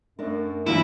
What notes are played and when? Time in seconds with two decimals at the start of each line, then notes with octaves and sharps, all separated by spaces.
0.19 F#2 A3 D4 A#4
0.66 G2 E3 F#3 A#3 E4